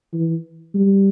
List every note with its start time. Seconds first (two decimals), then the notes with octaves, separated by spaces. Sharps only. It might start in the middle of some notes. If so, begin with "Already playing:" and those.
0.14 E3
0.75 G3